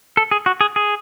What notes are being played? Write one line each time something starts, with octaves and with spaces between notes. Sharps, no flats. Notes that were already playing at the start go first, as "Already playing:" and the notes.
A4
G#4
F#4
G#4
G#4